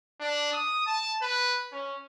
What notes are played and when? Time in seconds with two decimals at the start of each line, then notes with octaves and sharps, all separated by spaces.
0.20 D4
0.53 D#6
0.86 A5
1.22 B4
1.72 C#4